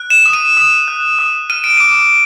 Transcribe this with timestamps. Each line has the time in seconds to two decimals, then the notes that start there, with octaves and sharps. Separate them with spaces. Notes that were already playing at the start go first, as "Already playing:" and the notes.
Already playing: F#6
0.10 E7
0.26 D#6
0.33 D#7
0.57 D#6
0.88 F#6
1.19 D#6
1.50 F6 D#7
1.64 D7
1.77 D6 D#7